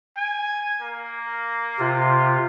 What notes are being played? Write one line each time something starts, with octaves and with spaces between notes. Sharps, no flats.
G#5
A#3
C3 F4